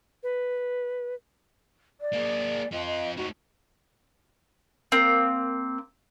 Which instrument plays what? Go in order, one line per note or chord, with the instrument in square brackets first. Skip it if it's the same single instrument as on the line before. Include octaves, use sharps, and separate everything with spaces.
[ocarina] B4
[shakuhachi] D5
[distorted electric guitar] A#3 G#4
[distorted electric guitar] C4 F4 [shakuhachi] D#5
[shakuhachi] D#5
[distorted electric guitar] A3 D#4 [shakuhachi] F#4
[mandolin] A#3 C4